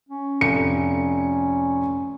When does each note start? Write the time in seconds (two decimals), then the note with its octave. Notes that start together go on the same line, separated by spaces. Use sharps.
0.09 C#4
0.41 F1 C#7